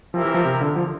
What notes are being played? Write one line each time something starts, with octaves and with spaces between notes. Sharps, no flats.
F3 C4 E4 G4 A#4 E5
E3
F3
C3
D3
F3